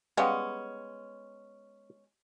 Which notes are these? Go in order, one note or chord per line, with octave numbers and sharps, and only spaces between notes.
G3 G#3 B3 C#4 F5